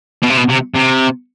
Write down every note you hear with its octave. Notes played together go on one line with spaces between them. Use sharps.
B2
C3
B2
C3
C3